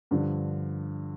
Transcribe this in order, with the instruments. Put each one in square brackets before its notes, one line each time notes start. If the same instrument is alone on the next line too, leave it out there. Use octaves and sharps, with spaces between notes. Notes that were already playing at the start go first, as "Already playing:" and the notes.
[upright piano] G2 D3 F3